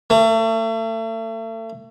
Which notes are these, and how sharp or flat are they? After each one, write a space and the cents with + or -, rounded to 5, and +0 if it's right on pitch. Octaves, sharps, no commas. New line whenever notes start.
A3 +35